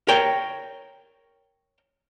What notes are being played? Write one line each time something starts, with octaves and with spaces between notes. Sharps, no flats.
A#4 C#5 G5